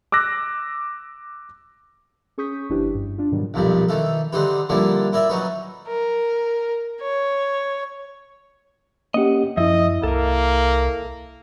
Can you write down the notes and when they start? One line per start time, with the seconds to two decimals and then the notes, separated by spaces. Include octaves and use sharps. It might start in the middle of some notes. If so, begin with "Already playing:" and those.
0.12 D6 E6 F#6 A#6
2.38 C#4 G#4 C#6 D#6 G6 B6
2.70 G1 F3 D4 E4 G4 B4
2.95 G2
3.18 D4 F4
3.32 G#2 B2 D#3 F#3 G3
3.54 B1 F2 A#2 G3
3.89 D#3 E3 A4
4.33 D3 C4 D#4 G4 B4
4.69 D3 F3 G3 A#3 D4 E4
5.13 E4 A#4 D5 E5
5.29 F#3 C#4 D#4 B4
5.87 A#4
7.02 C#5
9.14 A#3 C#4 G4 D#5 F#5
9.57 F#2 F3 E4 D#5 E5
10.03 C2 A#3 A4 A#4